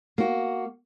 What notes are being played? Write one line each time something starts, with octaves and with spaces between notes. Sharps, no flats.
A#3 F#4